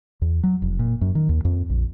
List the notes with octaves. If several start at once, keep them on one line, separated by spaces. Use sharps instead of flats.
E2
F#3
F1
A#2
F#2
D#3
D#2
F2
A#1